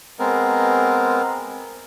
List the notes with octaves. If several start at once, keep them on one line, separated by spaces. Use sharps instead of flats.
G#3 B3 C4 A#4